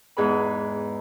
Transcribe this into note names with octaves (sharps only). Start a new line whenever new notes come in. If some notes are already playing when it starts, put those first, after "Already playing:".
E2 G#2 G#4 B4 B5